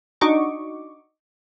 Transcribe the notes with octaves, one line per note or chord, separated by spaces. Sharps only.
D4 D#4 F#4 D#5 C#6 D6